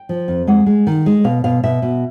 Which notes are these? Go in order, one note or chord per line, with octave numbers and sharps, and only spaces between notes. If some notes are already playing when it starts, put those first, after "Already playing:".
Already playing: G5
F3
F2
G#3 F#5
G#3
D#3
G#3
B2 F5
B2 F5
B2 E5
B2